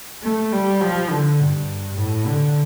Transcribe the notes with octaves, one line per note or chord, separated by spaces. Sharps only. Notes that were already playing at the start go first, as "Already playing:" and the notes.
A3
G3
F3
D3
G2
A2
D3